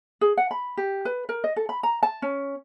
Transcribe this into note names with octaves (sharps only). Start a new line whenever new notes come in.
G#4
F#5
B5
G4
B4
A#4
D#5
A4
B5
A#5
A5
C#4